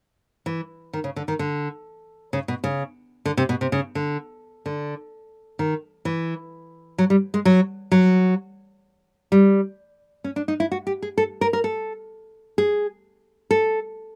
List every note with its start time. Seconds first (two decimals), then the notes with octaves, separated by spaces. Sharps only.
0.46 E3
0.93 D#3
1.04 C#3
1.16 D3
1.28 D#3
1.39 D3
2.33 C#3
2.48 B2
2.64 C#3
3.25 D3
3.37 C3
3.49 B2
3.61 C3
3.72 C#3
3.95 D3
4.66 D3
5.59 D#3
6.05 E3
6.98 F#3
7.10 G3
7.34 G#3
7.45 F#3
7.92 F#3
9.32 G3
10.24 C#4
10.36 D4
10.48 D#4
10.60 E4
10.72 F#4
10.87 G4
11.02 G#4
11.18 A4
11.41 A#4
11.53 A#4
11.64 A4
12.58 G#4
13.51 A4